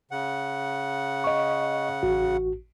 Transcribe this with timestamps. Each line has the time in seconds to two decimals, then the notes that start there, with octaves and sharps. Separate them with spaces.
0.11 C#3 F#5
1.24 D#5 C#6
2.03 A1 F#4